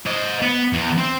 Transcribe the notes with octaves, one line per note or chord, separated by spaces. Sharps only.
C5 D#5
B3
E2
C4 C5